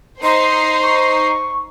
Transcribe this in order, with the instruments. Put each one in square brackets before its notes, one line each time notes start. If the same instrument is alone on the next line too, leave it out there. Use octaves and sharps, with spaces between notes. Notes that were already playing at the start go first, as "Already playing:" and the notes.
[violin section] D#4 C5 C7 [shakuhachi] C6
[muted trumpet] C#6